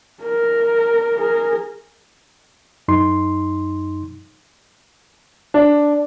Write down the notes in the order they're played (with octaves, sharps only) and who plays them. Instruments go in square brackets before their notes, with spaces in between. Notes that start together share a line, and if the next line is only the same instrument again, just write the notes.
[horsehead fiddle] A#4
G#4 A#4
[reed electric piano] F#2 D#4 C6
[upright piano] D4